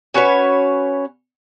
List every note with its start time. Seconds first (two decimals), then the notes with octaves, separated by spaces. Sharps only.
0.14 C#4 F#4 B4 C#5